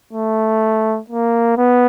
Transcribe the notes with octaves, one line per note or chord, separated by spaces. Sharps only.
A3
A#3
B3